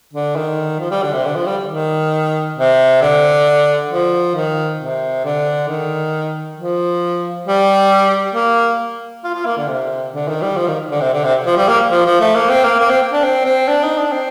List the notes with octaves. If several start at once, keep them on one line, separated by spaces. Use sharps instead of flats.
D3
D#3
F3
G3
D3
C3
D3
F3
G3
D#3
C3
D3
F3
D#3
C3
D3
D#3
F3
G3
A#3
F4
F4
A#3
D3
C3
D3
D#3
G3
F3
D#3
D3
C3
D3
C3
F3
G3
A#3
F3
F3
A3
A#3
C4
A#3
A#3
C4
D4
C4
C4
D4
D#4
D4
C4